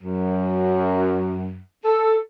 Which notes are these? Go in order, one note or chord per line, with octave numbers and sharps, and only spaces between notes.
F#2
A4